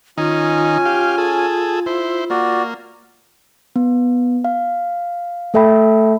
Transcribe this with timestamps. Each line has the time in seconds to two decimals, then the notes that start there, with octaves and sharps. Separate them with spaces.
0.18 D#3 C#4 D#4 F4 G#5
0.85 G4 F5
1.18 G#4 A4
1.86 E4 C5
2.30 A#3 F#4 D5
3.76 B3
4.44 F5
5.54 A3 A4 E5 G5 B5